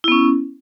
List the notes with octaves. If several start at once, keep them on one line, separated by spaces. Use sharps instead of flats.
B3 C#4 E4